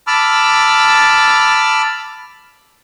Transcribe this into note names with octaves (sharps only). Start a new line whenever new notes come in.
A5 B5 D6 E6 F6